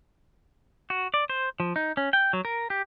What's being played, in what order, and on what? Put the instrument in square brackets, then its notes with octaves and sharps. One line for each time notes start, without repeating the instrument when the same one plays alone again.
[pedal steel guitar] F#4
D5
C5
F3
D#4
C#4
G5
F#3
A#4
G4